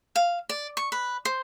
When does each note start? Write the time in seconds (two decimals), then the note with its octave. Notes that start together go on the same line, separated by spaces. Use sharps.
0.16 F5
0.49 D5
0.77 C#6
0.92 B4
1.25 C5